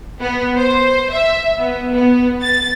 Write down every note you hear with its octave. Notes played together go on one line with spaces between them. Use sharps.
B3
C5
E5
B3
B3
A6